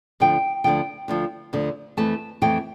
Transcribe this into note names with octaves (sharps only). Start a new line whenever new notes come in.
D2 D3 F3 G5
D2 D3 F3 G5
D2 D3 F3
D2 D3 F3
F2 E3 A3 A5
F2 E3 A3 G5